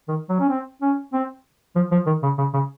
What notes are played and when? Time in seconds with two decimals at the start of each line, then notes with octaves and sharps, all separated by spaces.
0.08 D#3
0.29 F#3
0.40 C#4
0.49 C4
0.82 C#4
1.13 C4
1.76 F3
1.92 F3
2.06 D#3
2.23 C#3
2.38 C#3
2.53 C#3